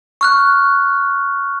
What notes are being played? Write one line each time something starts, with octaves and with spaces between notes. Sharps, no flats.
C#6 F6 F#6